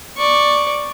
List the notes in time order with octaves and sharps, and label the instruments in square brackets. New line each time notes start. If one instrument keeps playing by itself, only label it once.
[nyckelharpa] D5 C#6